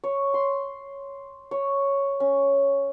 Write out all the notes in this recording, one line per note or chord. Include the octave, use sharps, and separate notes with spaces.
C#5
C6
C#5
C#4